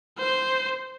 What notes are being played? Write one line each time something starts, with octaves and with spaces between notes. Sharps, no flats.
C5